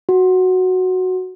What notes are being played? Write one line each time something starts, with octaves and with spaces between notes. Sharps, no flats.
F#4